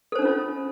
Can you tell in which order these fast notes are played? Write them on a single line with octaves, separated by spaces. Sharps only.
A4 C5 D4 C#4 F4